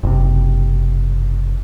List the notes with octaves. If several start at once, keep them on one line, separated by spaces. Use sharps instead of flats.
F#1 C3